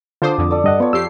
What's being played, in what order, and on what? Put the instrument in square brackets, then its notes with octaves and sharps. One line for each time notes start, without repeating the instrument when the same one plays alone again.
[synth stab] D3 C5 [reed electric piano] F4 [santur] A5 D6 D#6
[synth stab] F2 D3
[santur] A4 D5
[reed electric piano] G2 D#5 F#5
[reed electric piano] B3 [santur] F4 C#5
[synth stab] F2 G4 C7 [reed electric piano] E6